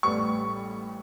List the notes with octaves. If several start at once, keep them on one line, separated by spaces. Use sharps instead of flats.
A1 A2 G3 B3 C#6